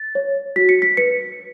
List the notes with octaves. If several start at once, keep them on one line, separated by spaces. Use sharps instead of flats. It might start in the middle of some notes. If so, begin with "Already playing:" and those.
Already playing: A6
C#5
F#4 B6
C#7
B6
B4 C#7